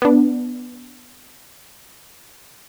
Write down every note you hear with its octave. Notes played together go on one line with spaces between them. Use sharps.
B3 D4